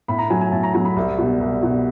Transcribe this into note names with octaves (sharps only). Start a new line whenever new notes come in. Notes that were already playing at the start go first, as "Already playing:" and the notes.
A2 B5
A#5
F#3 A3 G#5
G#5
A2 A5
A#5
F#3 A3 A#5
B5
C2
B2 G3
C2
B2 G3